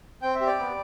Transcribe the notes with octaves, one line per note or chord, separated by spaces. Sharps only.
C4 G5
E5
G4
D5
B3